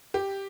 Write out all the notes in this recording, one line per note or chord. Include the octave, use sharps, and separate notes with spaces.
G4